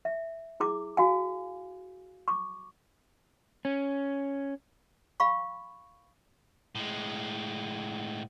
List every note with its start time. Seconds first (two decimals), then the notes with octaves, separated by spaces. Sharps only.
0.05 E5
0.60 E4 G#4 D6
0.97 F#4 F5 G#5
2.28 C#6 D6
3.65 C#4
5.20 F5 B5 C#6
6.75 A2 G#3